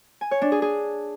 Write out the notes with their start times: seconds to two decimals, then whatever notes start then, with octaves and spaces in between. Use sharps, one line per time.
0.21 G#5
0.31 C#5
0.42 D4
0.52 G#4
0.62 G#4